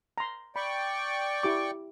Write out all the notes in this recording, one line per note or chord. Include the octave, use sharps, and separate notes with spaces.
A#5 C6
D5 G5 B5 C#6
E4 G4 D6